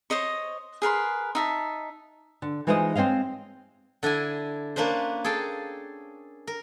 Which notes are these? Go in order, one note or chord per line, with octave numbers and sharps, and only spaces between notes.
C5 C#5 D#5 C#6
G#4 A#4 B4 C6
D#4 E5 A5
D3
E3 G#3 D#4 F4 C5 D#5
G#3 C4 C#5 D#5 F5
D3 D4 E4 G#5
A#3 C#4 D4 B4 C5
G#4 A4 F5 G5 A5
A#4